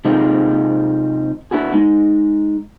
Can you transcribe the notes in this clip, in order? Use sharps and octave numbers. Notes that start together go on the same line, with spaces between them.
C3 G#3 C4 D#4 F4
B3 D4 E4 F#4 G#4
G#3 D#4